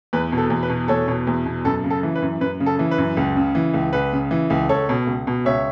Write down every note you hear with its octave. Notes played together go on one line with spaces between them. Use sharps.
E2 B4
B2
A4
E2
B4
B2
E2 A4 C#5
B2
E2
B2
F#2 A4
C#3
A4
E3
B4
F#2
F#2 B4
C#3
A4
E3
B4
F#2
C#2
C#3
E3
C#2
C#2 B4
C#3
E3
C#2
C#2 A4 C#5
B2
C#2
B2
C#2 C#5 E5